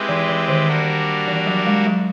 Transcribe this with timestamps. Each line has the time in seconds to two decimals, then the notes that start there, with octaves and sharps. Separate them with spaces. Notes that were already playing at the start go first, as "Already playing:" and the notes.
Already playing: G#3 C4 E4 G4 B4
0.09 E3
0.29 E3
0.49 D#3
0.68 G3 A#3 D4 F#4 A#4
1.28 E3
1.47 F#3
1.67 G#3
1.87 F#3